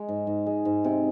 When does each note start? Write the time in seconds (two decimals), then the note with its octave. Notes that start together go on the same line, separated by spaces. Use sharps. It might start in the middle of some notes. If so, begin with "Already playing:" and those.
Already playing: G#3
0.09 G#2
0.27 G#2
0.46 G#3
0.65 G#2
0.84 C3